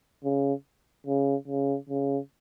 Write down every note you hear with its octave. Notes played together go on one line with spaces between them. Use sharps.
C#3
C#3
C#3
C#3